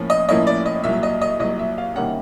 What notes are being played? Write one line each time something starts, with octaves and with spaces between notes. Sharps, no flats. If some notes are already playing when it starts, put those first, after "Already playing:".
Already playing: A2 F3 A#3 C#4
D#5
A2 F3 A#3 C#4 E4 D#5
D5
D#5
C2 A#2 F#3 E5
D#5
D#5
C2 A#2 F#3 D#5
E5
F5
C3 D#3 G3 A#3 C#4 F#5